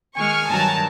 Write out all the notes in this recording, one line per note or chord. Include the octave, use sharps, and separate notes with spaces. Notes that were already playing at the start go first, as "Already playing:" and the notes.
D#3 G#3 G#5 C#6 F6
G2 D#3 F#3 A5 A#5